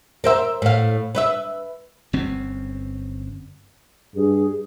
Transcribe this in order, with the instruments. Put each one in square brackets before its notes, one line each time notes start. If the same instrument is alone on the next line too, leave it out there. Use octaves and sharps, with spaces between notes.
[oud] A#4 C5 E5
A2 F5
B4 C#5 E5
[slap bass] G1 C4 C#4
[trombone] G2 [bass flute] G#4